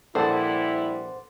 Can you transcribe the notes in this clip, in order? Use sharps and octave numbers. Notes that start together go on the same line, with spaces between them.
A#1 G3 E4 A4 C5 D5 F#5